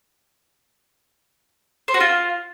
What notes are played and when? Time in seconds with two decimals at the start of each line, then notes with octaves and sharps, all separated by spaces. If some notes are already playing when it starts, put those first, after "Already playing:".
1.88 C5
1.94 F#4
2.00 F4